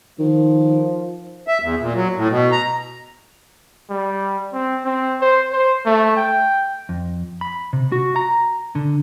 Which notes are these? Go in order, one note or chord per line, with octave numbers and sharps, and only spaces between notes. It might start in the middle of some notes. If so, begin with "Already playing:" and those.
D#3 F3
E5
E2
A#2
F#3
A2
B2
A#5
G3
C4
C4
C5
C5
A3
G5
F2
B5
C3
F#4
A#5
D3